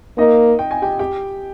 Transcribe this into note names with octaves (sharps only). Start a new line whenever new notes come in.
A#3 D#4 D#5
G5
G#5
G4 G5
G4 G5